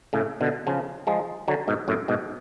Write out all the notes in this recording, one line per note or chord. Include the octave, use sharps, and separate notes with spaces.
A2 C#3
B2 D3
C#3 F3
F3 G#3
D3 F#3
G#2 B2
F#2 A2
G#2 B2